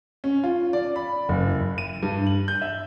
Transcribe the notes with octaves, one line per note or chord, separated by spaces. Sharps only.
C#4
F4
D5
B5
F#1
E4
D#7
G2
F#7
G6
E5